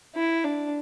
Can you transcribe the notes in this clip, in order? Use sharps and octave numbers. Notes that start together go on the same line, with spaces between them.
E4
D4